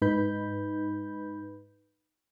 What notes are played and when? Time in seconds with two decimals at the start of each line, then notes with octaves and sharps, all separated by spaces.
0.02 G#2 D#4 B4 B5 G6